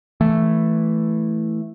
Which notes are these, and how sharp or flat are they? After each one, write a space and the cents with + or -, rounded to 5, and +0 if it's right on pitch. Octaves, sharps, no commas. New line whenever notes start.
E3 +0 A3 +0